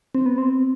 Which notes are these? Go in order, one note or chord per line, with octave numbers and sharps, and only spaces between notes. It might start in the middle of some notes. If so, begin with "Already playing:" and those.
C4
B3
C4